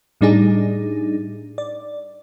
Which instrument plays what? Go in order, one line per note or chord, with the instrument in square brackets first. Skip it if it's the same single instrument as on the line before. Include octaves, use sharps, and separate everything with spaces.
[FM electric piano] A2 G3 D4 D#4 G#4
D5